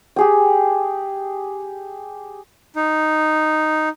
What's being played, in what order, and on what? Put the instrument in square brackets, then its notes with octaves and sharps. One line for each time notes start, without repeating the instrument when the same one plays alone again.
[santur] G4 G#4 G5
[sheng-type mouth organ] D#4